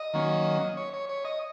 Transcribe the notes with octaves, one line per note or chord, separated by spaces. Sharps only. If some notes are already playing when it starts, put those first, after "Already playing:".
Already playing: D#5
D#3 F#3 A#3 C#4
C#5
C#5
C#5
D#5